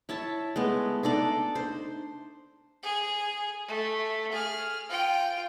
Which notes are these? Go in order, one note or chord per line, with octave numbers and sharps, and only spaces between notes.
E4 C#5 E5 A5
G#3 A3 B3
D4 D#4 A4 D5
C5
G#4
A3
G#4 F6
F4 G5